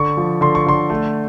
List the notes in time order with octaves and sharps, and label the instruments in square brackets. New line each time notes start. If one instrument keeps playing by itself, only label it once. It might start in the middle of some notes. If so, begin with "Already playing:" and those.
Already playing: [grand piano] D3 C#6
F3
D3 C6
C#6
D3 C6
A3